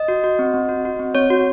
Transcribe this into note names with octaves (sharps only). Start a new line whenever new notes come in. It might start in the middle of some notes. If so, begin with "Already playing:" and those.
Already playing: D#5
F#4
F#4
C4
C4
F#4
F#4
C4
C4 C#5
F#4